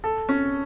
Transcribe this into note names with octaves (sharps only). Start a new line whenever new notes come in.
A4
C#4